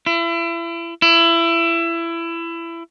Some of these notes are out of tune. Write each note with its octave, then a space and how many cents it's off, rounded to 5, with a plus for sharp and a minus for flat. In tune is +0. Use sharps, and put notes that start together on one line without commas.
E4 +35
E4 +25